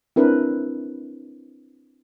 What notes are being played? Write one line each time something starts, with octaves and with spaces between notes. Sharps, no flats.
C4 D4 E4 A#4 B4